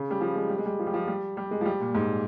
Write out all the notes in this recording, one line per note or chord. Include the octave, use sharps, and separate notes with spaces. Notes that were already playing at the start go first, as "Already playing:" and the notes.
Already playing: C#3
G3
F3
G#3
G3
G#3
G3
F3
G3
F3
G3
G3
G#3
F3
G3
A#2
G#2